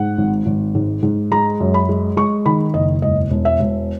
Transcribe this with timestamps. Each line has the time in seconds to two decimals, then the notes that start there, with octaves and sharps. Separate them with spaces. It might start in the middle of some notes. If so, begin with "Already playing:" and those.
Already playing: G#2 F#5
0.18 G#1
0.46 G#1
0.75 G#2
1.03 G#2
1.31 G#3 A#5
1.60 F#2
1.74 B5
1.89 G#3
2.17 G#3 C#6
2.46 D#3 B5
2.74 F#1 D#5
3.02 E1 D#5
3.30 E1
3.45 E5
3.59 E1